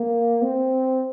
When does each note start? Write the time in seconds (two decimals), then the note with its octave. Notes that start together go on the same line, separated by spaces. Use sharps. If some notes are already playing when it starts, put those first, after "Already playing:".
Already playing: A#3
0.42 C4